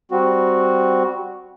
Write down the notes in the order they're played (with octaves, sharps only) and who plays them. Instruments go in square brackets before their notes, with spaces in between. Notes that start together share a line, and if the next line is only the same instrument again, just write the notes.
[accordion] G3 C4 F#4